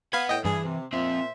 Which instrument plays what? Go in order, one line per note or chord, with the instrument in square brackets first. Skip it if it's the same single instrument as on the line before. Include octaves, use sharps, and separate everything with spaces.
[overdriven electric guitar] B4 F#5 [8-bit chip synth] F5 B5 G#6
[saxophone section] A2 [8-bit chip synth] D#5 G5
[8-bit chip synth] G2 [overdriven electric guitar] E3 [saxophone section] G#4
[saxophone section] C3
[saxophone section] A#2 C5 E5 [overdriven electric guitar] C4 F4